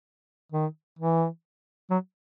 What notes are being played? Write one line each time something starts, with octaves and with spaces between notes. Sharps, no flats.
D#3
E3
F#3